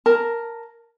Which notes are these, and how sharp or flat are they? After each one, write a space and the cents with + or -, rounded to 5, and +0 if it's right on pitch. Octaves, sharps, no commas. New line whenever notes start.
A#4 +0 A5 +15